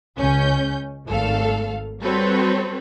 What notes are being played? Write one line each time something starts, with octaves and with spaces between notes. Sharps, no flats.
C#2 C#4 G6
G#1 A3 A4 F5
G3 C4 F#4 A4 B4 C#5